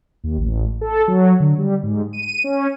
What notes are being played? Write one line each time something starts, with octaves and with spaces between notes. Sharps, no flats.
D#2
A1
A4
F#3
D3
G3
G#2
D#7
C#4